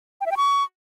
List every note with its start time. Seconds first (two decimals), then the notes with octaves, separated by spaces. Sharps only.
0.21 G5
0.26 E5
0.31 G5
0.37 C#6